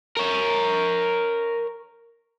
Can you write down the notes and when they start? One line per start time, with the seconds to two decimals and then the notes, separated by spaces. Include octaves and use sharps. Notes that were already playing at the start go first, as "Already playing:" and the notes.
0.17 A#4 C#5